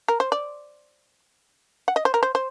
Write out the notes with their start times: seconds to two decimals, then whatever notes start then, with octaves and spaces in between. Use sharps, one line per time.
0.08 A#4
0.20 C5
0.32 D5
1.88 F#5
1.96 D#5
2.05 C5
2.14 A#4
2.23 C5
2.35 C5